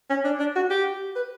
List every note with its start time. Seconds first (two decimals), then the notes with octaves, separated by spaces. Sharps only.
0.10 C#4
0.24 D4
0.39 D4
0.56 F#4
0.70 G4
1.16 B4